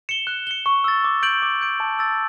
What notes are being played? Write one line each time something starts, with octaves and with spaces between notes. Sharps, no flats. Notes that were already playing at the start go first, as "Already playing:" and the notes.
C#7 E7 G7
F#6
C#7 G7
C#6
E6 A6
D6
G6 D7 F#7
D6
G6 D7
A5
E6 A6